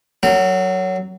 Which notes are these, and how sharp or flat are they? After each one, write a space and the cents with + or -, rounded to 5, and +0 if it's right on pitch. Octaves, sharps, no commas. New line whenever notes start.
F#3 +15 A#4 -45